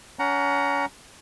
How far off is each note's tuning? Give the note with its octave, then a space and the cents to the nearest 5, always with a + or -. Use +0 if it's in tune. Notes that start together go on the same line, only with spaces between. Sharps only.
C#4 +30 F#5 +15 A#5 +0